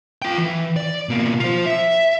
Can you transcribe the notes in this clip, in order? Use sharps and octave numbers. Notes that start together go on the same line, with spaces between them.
F4 G5
E3
D5
B2 A#3
F4 C5
E5